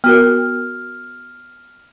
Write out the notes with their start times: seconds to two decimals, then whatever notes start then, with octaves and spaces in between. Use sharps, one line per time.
0.04 B3 F#4 A#4 F6